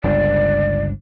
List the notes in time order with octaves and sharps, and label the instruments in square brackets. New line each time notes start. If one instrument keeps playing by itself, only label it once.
[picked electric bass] G1 C#2 G2 [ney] D5